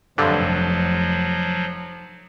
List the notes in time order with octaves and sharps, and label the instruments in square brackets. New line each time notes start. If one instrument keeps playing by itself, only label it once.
[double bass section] F1 [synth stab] G2 D3 [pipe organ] F3 F#3